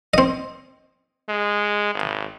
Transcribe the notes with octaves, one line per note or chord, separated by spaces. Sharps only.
C4 D#5
G#3
G#1